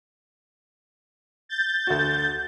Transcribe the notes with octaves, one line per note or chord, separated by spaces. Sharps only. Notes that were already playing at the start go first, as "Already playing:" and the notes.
G6 A6
D2 F#4